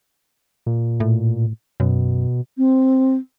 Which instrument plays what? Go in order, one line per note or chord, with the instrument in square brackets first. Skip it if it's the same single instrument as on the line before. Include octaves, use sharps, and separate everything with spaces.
[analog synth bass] A#2
[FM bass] A2
[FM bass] F#2 [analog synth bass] B2
[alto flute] C4